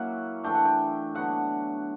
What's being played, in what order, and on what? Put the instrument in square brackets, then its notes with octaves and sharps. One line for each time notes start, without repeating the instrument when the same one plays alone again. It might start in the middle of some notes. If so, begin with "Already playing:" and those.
Already playing: [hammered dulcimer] F#3 A#3 C#4 E4 F#5
E3 A3 D4 G5
F#5
G5
D3 F#3 B3 F#5